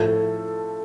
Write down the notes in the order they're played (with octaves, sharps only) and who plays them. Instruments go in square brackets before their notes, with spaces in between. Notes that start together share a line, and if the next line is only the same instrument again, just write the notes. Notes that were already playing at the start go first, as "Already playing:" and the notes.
Already playing: [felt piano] A2 F3 A3 [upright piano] A4